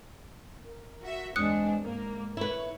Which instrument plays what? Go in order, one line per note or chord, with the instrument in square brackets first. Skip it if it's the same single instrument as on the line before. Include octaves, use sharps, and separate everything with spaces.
[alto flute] A#4
[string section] F#4 E5
[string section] E2 C4 D4 [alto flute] G#3 [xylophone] D#6 F#6 C#7
[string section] G#2 A#3 [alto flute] A#4
[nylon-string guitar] E4 B4 [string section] C#5